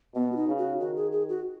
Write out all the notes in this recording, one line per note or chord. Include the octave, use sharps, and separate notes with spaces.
B2 B3
F#4
D#4
C#3
F#4
D#3 F#4
G#4
G#4
F#4